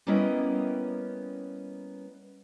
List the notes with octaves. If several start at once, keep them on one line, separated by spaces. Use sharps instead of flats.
G3 A#3 B3 C#4 E4 D#5